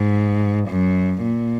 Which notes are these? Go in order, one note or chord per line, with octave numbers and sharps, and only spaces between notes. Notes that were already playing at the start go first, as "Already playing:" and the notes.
Already playing: G#2
F#2
A#2